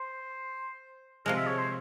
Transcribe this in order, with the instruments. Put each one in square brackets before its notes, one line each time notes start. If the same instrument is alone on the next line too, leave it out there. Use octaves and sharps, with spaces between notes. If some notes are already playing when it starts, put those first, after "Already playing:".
Already playing: [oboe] C5
[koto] C3 F3 G#3 [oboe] A#4
[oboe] E5
C#5
C5